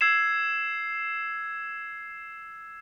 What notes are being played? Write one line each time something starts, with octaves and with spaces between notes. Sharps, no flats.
E6 G#6 C7 E7